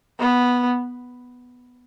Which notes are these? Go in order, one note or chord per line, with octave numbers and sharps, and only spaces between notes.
B3